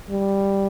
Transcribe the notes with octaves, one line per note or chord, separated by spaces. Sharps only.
G3